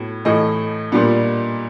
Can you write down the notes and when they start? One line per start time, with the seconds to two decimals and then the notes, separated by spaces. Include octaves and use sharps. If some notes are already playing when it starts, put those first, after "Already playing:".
Already playing: A2 F#3 B3
0.25 A2 E3 A3 D#5
0.92 A#2 G3 B3 D4